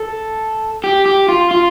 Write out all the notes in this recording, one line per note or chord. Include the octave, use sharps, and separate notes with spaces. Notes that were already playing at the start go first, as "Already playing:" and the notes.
Already playing: A4
G4
G4
F4
F4